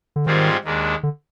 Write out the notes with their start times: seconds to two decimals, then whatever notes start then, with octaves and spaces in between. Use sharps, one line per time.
0.16 D3
0.26 G#2 D#3 G3 C4 F4 G#4
0.64 D#2 D#3 G#3 D4
1.03 D3